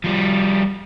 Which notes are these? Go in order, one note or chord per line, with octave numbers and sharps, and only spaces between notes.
F3 G3